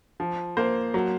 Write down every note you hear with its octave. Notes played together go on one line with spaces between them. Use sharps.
F3
A#3 C5
F#3